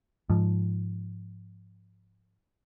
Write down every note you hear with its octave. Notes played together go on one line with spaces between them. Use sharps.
G#2 F3